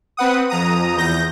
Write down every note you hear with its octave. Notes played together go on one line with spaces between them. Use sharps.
C4 B4 F#5 D#6
F2 A#5 D#6
E2 G6 A#6